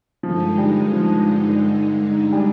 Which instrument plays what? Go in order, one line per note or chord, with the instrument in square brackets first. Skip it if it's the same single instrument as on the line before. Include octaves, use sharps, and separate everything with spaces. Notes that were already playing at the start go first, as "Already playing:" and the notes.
[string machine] G2 D3 G#3 D#4 [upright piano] F3
[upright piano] G3
F3
G3